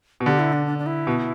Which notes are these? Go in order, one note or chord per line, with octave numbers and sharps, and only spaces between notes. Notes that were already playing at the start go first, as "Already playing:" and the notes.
B2
D3 G4
E4
D4
D4
D4
E4
B2